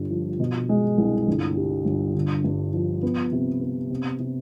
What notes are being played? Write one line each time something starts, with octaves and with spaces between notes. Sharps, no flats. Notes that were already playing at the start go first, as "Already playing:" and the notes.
Already playing: G1 G2
F3
B2
G#3
C2
G1
G3
G1
D3
G2
F3
B3
C3
B3
C3
C3